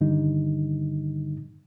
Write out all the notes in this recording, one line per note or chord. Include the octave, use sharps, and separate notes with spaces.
G2 D3 D#3 G3 D#4